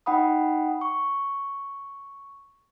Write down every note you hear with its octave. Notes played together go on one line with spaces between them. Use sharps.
D#4 F#5 G5 B5 D#6
C#6